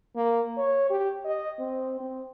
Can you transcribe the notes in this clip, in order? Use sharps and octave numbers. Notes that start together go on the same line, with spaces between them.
A#3
C#5
G4
D#5
C4
C4